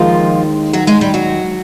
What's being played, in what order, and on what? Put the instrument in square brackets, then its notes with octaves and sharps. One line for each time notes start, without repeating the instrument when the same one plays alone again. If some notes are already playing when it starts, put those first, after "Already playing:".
Already playing: [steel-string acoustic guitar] D#2 D#3 F3 G#3 F4
F#3 F#4
G#3 G#4
G3 G4
F#3 F#4